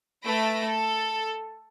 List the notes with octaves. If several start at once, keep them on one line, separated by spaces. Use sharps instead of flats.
A3 B4 A5 B5 A#6 D7
A4